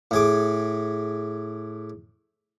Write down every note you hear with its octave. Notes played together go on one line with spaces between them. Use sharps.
A2 G#4 D6